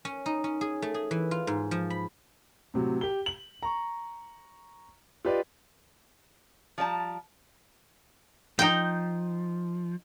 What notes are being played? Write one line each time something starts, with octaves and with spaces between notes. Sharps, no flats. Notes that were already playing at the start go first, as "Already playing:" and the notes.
C#4
D#4
C#4
G#4
A3
G#4
E3
F4
G#2
F3
B5
A2 C3 F#3
G4 G7
F#7
A#5 C#6
F4 G4 B4 D5 D#5
F3 G3 D5 A5 A#5
F3 D#4 G5